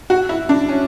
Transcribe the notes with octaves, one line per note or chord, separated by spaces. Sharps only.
F#4
E4
D4
C#4